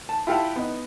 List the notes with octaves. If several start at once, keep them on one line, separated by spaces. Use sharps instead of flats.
A5
E4 F4 G4 F5 F#5 A5
B3 D#4